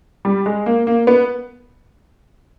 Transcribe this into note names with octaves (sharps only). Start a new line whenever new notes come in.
G3
G#3
A#3
A#3
B3